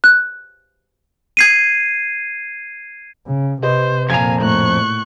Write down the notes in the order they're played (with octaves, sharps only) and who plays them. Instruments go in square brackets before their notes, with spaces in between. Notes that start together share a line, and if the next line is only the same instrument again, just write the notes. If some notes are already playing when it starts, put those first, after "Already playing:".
[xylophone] F#6
[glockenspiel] G#6 C7 D#7
[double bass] C#3
[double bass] C3 [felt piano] G4 B4 D#5 [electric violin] C5
[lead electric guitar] F2 A#5 [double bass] A#2 [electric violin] F5 G#5 [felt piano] G#6
[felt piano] A2 [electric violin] C#6 F#6